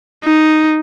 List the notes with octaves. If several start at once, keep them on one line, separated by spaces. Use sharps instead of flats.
D#4